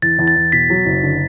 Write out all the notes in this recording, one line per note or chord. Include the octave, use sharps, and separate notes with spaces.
E2 A6
E2
A6
E2
B2 B6
F#3
F#1
D3